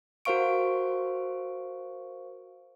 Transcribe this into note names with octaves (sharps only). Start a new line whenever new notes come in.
F#4 A#4 C5 F5 C#6 D7